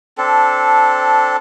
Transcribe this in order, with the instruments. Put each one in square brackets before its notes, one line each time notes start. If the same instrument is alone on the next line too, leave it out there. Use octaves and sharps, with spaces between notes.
[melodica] C4 D4 A4